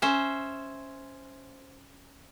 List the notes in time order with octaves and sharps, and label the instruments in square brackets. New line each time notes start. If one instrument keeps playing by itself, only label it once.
[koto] C#4 C5 E5